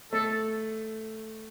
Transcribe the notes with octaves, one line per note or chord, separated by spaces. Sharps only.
A3 A4